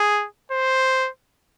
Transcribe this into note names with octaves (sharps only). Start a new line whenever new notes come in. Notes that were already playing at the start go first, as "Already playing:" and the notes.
Already playing: G#4
C5